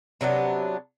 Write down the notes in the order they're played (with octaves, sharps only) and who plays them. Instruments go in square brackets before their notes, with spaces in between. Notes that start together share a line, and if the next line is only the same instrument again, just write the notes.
[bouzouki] C3 F#3 B3 D4